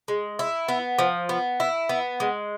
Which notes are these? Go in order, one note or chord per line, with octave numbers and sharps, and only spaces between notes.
G#3
E4
B3
F3
B3
E4
B3
G#3